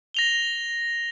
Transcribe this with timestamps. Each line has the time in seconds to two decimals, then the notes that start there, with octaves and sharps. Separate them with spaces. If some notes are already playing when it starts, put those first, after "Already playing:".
0.14 A#6 F7 G7